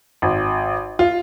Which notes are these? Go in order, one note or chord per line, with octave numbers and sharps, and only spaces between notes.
G#1
F4